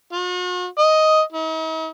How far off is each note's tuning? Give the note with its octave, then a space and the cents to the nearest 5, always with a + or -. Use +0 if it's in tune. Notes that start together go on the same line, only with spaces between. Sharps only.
F#4 -45
D#5 +5
D#4 +45